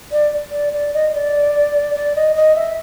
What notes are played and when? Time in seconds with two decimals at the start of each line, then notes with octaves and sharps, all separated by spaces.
0.12 D5
0.52 D5
0.73 D5
0.94 D#5
1.14 D5
1.95 D5
2.16 D#5
2.36 D#5
2.55 E5